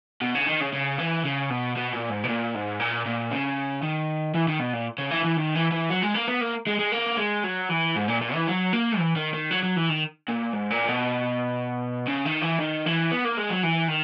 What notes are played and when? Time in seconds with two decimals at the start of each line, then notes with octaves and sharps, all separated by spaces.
0.22 B2
0.35 C#3
0.47 D#3
0.61 C#3
0.73 C#3
0.99 E3
1.24 C#3
1.50 B2
1.76 B2
1.93 A#2
2.10 G#2
2.24 B2
2.28 A#2
2.54 G#2
2.80 A#2
3.05 A#2
3.31 C#3
3.83 D#3
4.35 E3
4.48 D#3
4.59 B2
4.73 A#2
4.98 C#3
5.11 E3
5.25 E3
5.37 D#3
5.55 E3
5.71 E3
5.90 F#3
6.02 G#3
6.14 A#3
6.28 B3
6.41 A#3
6.67 G#3
6.79 G#3
6.92 A#3
7.18 G#3
7.44 F#3
7.69 E3
7.96 G#2
8.08 A#2
8.21 A#2
8.34 E3
8.47 F#3
8.73 A#3
8.99 E3
9.16 D#3
9.34 D#3
9.51 F#3
9.63 F#3
9.76 E3
9.89 D#3
10.28 A#2
10.53 G#2
10.70 A#2
10.88 B2
12.08 C#3
12.26 D#3
12.42 E3
12.59 D#3
12.86 E3
13.11 B3
13.25 A#3
13.37 G#3
13.50 F#3
13.63 E3
13.88 D#3